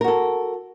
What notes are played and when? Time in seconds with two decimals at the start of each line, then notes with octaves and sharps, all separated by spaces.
0.01 A#4
0.04 F#4
0.08 A4